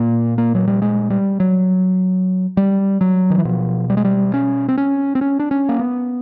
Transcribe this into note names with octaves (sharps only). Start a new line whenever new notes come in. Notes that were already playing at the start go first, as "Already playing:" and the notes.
Already playing: A#2 A#3
A#3
F#3
G3
G#3
G3
F#3
G3
F#3
D#3
E3
B2 F3
G3
G#3
G3
C#4
C4
C#4
C4
C#4
D4
C#4
A#3
B3